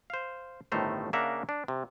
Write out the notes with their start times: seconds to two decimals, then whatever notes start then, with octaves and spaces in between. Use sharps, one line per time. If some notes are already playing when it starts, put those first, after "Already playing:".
0.10 C5 F5
0.72 G1 A2 D#3 A3 C5 A#5
1.13 C#3 A#3 D4 E5 F#5 A#5
1.49 D4
1.68 C3